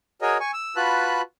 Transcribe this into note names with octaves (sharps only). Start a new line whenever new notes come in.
F#4 G#4 A#4 C#5 D#5
G#5 C#6
E6
F4 F#4 B4 A5 B5 F#6